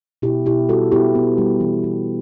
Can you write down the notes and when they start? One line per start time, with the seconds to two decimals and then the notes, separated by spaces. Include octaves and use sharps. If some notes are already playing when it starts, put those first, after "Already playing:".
0.22 B2 E4 G4
0.46 B2 E4 G4
0.69 G3 F#4 A4
0.92 B3 E4 G4
1.15 B3
1.38 G3
1.60 E3
1.84 E3